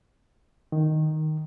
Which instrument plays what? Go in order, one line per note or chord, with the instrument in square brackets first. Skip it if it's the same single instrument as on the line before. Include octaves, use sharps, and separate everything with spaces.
[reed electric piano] D#3